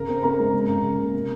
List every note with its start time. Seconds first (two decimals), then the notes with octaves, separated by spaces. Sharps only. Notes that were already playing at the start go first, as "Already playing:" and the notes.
Already playing: C#3 A#4 A#5
0.09 C4
0.23 C4 A#4 A#5
0.39 G#3
0.54 C#3
0.69 C#3
0.83 C#3
0.99 A#3
1.14 C3